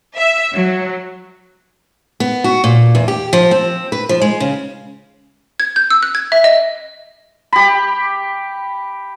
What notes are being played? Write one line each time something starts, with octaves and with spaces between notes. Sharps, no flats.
E5
F#3
B3
F#4
A#2
E2
G4
F3
C4
B4
F3
G#3
C#3
G#6
G6
E6
F#6
G#6
E5
D#5
G4 B5